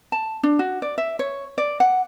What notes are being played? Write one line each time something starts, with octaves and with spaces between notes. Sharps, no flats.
A5
D4
F#4
D5
E5
C#5
D5
F#5